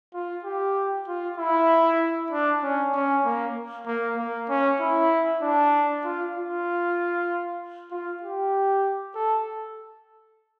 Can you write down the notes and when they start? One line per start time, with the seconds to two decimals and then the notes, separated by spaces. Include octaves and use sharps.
0.14 F4
0.44 G4
1.08 F4
1.38 E4
2.31 D4
2.63 C#4
2.94 C#4
3.25 A#3
3.87 A#3
4.17 A#3
4.49 C#4
4.80 E4
5.42 D4
6.04 F4
6.35 F4
7.91 F4
8.23 G4
9.15 A4